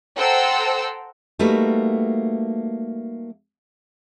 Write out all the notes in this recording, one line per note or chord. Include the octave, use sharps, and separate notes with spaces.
A4 C5 F#5 G5 A#5 E6
G3 A3 A#3 D#4 F#4 B4